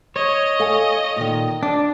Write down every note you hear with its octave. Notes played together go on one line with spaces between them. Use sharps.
C#5 D#5
A4 F5 G#5
A#2 D#3
D4 D5